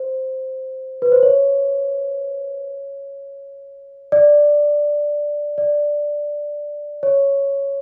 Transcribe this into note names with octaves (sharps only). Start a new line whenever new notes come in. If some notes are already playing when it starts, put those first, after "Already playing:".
Already playing: C5
B4
C5
C#5
D5
D5
C#5